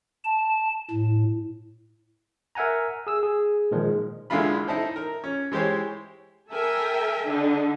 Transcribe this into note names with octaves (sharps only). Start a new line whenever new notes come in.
A5
A2
A#4 E5 F#5 G#5 A#5
G#4 E6
G#4
A#2 D#3 F3 G#3
A#1 D3 G#3 E4 F4 B5
D#4 E4 A4 C5
A#4
C#4
E3 G#3 G4 C5 C#5
A4 A#4 E5 G5 G#5
D3 D#4 A4